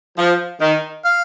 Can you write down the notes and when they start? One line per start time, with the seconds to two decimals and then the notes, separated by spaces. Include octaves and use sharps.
0.18 F3
0.61 D#3
1.05 F5